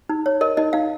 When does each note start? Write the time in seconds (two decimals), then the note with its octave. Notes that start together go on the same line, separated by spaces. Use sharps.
0.09 D#4
0.26 C#5
0.41 A#4 D#5
0.57 D#4 D#5
0.73 D#4 F5